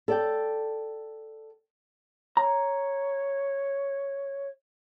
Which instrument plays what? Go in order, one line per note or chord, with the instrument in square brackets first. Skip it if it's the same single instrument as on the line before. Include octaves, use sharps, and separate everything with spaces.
[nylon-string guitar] A4 D5 G5
[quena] C#5 [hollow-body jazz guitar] A#5